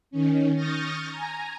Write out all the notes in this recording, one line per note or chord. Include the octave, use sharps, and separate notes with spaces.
D#3 C#4
C#6 D#6 F6 G6 A6 A#6
G#5 A#5